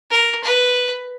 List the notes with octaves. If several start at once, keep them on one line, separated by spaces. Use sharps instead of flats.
A#4
B4